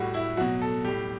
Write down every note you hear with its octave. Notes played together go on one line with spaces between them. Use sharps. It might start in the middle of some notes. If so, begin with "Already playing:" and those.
Already playing: A2 G3 F#4
E4
B2 F#3 F#4
A4
A2 G3 G4